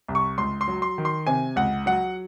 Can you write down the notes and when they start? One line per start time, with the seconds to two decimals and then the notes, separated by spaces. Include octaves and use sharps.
0.08 C2
0.15 C#6
0.38 C#2 C6
0.61 C6
0.68 F#3
0.82 C6
0.98 D#3
1.05 C6
1.27 C3 G#5
1.56 C#2 F#5
1.86 F#3 F#5